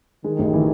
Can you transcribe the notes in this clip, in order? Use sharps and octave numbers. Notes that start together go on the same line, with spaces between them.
D#3 G#3
A1
E3